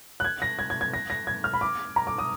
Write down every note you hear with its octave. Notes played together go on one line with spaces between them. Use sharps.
F#6
G#6
A#6
G#6
G#6
G#6
A#6
A#6
G#6
F6
B5
D6
A#5
D6
D#6